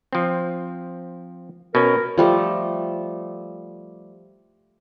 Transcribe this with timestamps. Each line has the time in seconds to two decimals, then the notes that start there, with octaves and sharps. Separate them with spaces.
0.13 F3 C4
1.75 B2 C#4 A#4
2.18 F3 G3 A3